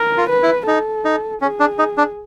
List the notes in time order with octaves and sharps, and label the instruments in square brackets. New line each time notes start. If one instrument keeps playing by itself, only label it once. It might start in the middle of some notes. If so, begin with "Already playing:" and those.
Already playing: [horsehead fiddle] A#4
[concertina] F4
[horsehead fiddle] B4
[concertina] E4
[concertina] D#4 [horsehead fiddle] A4
[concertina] D#4
[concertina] C#4 [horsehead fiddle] G#4
[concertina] D4
D#4
D4